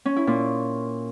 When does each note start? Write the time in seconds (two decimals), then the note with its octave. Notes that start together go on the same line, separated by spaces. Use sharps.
0.05 C#4
0.16 E4
0.27 A#2